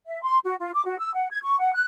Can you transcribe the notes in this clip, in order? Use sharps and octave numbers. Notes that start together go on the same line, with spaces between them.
E5
C6
F#4
F4
D6
F#4
E6
F#5
G#6
C#6
F#5
F#6